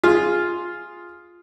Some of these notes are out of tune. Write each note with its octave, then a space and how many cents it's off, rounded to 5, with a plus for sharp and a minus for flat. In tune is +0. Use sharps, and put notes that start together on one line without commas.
F4 +0 G#4 +0